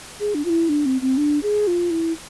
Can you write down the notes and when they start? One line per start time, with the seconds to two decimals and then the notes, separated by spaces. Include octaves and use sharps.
0.20 G#4
0.35 D4
0.45 F4
0.50 E4
0.69 D4
0.86 C4
1.01 C4
1.17 D4
1.43 G#4
1.67 F4
1.91 E4